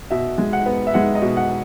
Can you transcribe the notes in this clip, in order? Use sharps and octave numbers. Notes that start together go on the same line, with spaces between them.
B2 E5
G#3
F#5
B3
E5
G#3 F#5
D#5
B2
F#5